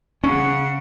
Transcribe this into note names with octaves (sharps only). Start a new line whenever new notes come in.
C#3 C#4 F#5 C#6